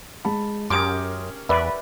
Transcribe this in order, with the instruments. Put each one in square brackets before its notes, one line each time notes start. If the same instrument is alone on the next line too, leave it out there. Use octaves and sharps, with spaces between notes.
[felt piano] G#3 A5 B5
[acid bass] F#2 [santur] C#4 G4 A#4 [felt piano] C6 D#6 [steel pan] D6
[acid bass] E2 [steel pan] B4 D5 E5 [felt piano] B5